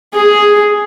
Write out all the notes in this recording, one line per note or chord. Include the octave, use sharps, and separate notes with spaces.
G#4